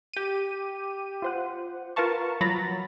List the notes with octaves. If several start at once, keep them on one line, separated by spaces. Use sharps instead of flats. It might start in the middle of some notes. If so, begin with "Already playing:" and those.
G4 D#7
F4 C5 F#5
F4 A#4 B4 F5 A5 C#6
F3 F#3 A#5 B5 A6 A#6